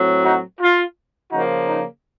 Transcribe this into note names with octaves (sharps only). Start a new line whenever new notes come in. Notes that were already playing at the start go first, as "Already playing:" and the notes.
Already playing: A2 F#3 C4
D#4 F#4
F4
C#3 F3 A#3 D#4 F#4
D#4